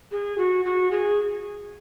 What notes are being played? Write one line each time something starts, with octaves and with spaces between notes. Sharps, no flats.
G#4
F#4
F#4
G#4